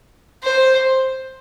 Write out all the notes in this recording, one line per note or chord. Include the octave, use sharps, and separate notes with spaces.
C5